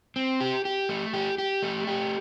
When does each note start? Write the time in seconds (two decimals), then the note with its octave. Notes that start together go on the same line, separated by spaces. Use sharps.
0.16 C4
0.40 G4
0.65 G4
0.89 A3
1.13 G4
1.38 G4
1.63 A3
1.87 G4